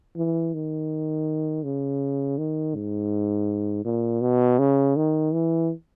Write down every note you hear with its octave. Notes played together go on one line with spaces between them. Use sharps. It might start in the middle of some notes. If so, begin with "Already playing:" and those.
E3
D#3
C#3
D#3
G#2
A#2
B2
C#3
D#3
E3